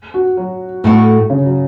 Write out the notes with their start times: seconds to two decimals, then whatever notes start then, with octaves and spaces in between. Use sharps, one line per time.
0.14 F#4
0.37 F#3
0.84 A2 A3 F#4
1.30 C#3
1.45 F#3